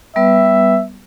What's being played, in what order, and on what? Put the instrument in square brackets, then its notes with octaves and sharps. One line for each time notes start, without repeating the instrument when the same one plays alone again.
[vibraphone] G3 B3 B4 [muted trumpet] E5